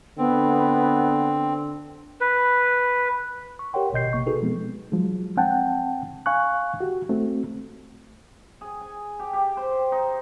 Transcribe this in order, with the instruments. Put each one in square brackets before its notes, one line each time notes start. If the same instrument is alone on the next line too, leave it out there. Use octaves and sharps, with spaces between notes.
[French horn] D3 [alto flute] B3 [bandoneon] C4
[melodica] B4
[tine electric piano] C#6
G4 A#4 C#5 F#5 G5 C6
G#1 B2 D#5 G6 C7
C3 A#3 C#6
D#4 F#4 G#4 A4 B4
B2 F3 G#3 B3 C4
[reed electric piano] F3 F#3 G#3
C4 F#5 G5 A5
F5 G#5 C#6 F#6
F#4 G4
A3 C4 F#4
[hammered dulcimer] G#4
G#5
G4
G4
C5
D#4